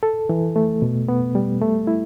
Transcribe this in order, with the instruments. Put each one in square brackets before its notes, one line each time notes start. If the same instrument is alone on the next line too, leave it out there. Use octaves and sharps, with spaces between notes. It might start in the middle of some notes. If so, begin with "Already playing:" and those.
[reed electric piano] A4
E3
A3
B2
B3
G3
A3
E4